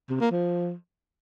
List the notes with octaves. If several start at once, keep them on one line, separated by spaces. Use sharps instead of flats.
C3
A#3
F3